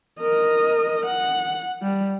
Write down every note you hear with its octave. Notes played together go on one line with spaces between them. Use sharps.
A#4 D#5
F#5
G3